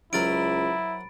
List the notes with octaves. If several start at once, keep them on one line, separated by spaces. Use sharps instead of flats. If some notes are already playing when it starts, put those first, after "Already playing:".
C#2 F#3 E4 A#4 C5 B5 A6 D7